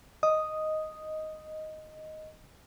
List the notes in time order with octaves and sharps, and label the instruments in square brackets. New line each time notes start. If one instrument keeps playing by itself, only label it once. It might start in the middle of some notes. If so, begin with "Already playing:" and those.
[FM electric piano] D#5 [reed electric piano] D#6